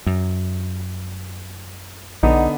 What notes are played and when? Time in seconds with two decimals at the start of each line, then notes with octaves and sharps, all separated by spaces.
0.06 F#2
2.23 B1 D3 B3 D4 D#4